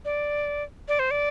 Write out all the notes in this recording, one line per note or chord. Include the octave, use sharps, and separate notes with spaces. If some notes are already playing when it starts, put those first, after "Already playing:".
D5
D5
C5
D5